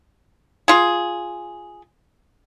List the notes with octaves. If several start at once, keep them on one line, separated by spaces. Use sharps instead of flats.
F4 G#4